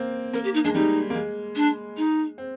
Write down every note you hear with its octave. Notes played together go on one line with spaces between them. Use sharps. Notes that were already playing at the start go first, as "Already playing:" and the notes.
Already playing: A#3 C4
A#3 A#4
G4
D#4
G#3 D4
G3 D#4
A#3
G#3
D4
D#4
C4